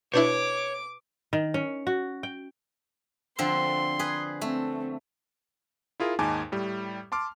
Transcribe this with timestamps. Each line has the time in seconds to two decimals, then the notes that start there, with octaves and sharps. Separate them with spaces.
0.14 B2 D4 E4 B4 C#5 D6
1.33 D#3
1.54 C#4
1.87 F#4
2.23 G5
3.39 D3 F3 C4 C6
3.99 G#4 B4
4.41 A3 C4
6.00 E4 F4 G#4 A#4
6.19 D#2 G#2 D#4 G#5 A5 D6
6.52 A2 G3
7.12 A5 C6 D6 F6